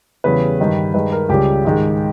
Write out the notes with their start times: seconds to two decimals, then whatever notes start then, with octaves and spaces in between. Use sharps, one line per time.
0.24 E2 C#3 G3 B4
0.59 G2 D#3 G3
0.94 G2 D#3 G#3 B4
1.12 A#4
1.29 C#2 C#3 G3 G4
1.65 G#2 D#3 G#3